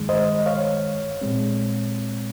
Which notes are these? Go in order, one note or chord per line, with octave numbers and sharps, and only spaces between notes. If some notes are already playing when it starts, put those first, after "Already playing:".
Already playing: G2 D#3 G#3
C5 D#5
C#5 F5
A#2 G#3 C4